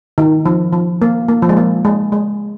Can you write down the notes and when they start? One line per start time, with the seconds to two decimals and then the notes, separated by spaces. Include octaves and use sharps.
0.18 D#3
0.46 F3
0.73 F3
1.02 A#3
1.29 A#3
1.42 F3
1.49 G#3
1.57 A#3
1.85 G#3
2.12 G#3